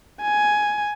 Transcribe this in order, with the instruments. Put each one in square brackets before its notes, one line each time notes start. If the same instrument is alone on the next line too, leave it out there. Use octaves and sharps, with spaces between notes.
[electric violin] G#5